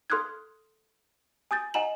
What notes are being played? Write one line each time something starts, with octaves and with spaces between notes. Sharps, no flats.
A4 C6 D#6 F6 F#6 G#6
G#5 D#6 G6 A6
D#5 F#5 G#5 A#5 E7 F#7